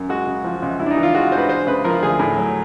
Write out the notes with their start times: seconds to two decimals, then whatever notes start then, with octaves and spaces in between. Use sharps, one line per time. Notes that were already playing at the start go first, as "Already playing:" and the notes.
Already playing: F#2
0.09 G#3 F#4
0.26 C#3
0.44 F3
0.63 C#2
0.79 G2 E4
0.86 D4
0.91 D#4
0.97 E3
1.03 F4
1.14 G#3 F#4
1.32 G2 C5
1.38 B4
1.49 G#3 C5
1.67 C#3 B4
1.84 F3 A#4
2.02 D2 G#4
2.19 A2
2.37 F#3